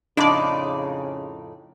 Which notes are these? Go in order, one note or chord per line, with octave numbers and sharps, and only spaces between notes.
F2 A2 C#3 D4 D#4 D5